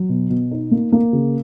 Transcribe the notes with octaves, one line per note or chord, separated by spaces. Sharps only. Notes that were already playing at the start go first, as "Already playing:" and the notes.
Already playing: F#3
B2
B2
D#4
A#3
A#3
C#3